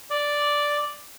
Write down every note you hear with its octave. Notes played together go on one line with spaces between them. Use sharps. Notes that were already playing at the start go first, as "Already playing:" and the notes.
D5